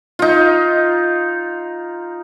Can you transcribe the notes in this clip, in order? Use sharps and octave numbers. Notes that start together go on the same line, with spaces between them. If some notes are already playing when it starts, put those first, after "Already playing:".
D#4 F4